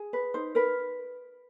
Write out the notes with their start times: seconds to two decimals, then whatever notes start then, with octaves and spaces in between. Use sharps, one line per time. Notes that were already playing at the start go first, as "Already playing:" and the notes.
Already playing: G#4
0.13 B4
0.34 D#4 C5
0.55 A#4 B4